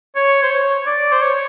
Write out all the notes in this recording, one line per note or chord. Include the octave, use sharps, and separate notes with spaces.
C#5
C5
C#5
D5
C5
C#5